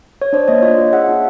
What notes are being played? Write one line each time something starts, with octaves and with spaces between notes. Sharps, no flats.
C#5
D4 C5 D5
A#3 C#5 D#5
F4 C#5 D#5
F4
G#4 E5 F#5
D4